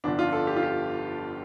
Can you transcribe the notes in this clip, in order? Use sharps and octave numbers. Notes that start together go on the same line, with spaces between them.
G1 F2 D3 D4
F4
A4
G4
F4
G4